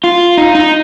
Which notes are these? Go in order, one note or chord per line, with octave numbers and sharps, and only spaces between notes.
F4
D#4
D#4